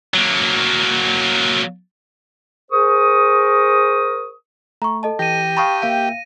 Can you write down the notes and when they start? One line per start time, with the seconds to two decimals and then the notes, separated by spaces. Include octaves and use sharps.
0.14 F#3 A#3
2.71 G#4 A#4 C5 C#6 D#6
4.82 A3 A#5 C#6
5.03 A4 D#5 A5
5.19 E3 G4 A#6 D#7
5.57 F5 G5 A5 B5 C#6 D#6
5.82 A#3 E5 F5 G5